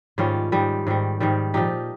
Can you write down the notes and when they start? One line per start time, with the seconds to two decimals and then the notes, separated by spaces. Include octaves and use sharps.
0.18 G#2 D#3 G3 C#4 F4
0.52 G#2 D#3 G3
0.87 G#2 D#3 G3
1.20 G#2 D#3 G3
1.54 A#2 F3 D#4 G4